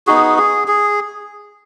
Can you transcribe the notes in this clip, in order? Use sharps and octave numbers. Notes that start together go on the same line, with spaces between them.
B3 D#4 F#4 G#4
G#4
G#4